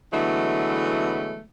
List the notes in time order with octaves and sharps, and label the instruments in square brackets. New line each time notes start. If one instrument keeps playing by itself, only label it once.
[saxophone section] D3 E3 F#3 G#3 A3 B3